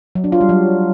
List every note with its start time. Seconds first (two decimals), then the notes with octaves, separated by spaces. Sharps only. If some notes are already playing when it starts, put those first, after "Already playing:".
0.15 F#3
0.24 D4
0.32 F4
0.41 G3
0.49 F#3